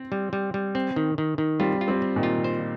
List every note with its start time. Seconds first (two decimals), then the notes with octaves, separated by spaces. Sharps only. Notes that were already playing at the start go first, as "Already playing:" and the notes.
Already playing: C4
0.12 G3
0.33 G3
0.54 G3
0.75 C4
0.96 D#3
1.18 D#3
1.38 D#3
1.60 G3 C4 F4
1.81 F4
1.88 G3 C4
2.02 C4
2.16 A#2 D#3
2.23 F4
2.44 C5